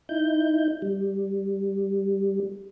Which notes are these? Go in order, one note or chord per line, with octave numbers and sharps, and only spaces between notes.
D#4 E4 G6
G3